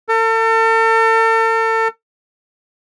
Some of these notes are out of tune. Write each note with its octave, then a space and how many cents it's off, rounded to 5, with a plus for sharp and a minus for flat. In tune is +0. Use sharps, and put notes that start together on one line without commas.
A4 +40